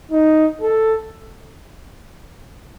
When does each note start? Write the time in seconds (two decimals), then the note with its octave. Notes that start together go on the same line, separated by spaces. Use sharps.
0.11 D#4
0.61 A4